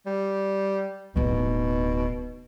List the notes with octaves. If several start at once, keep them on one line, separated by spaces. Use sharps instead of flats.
G3
D1 B2 D#4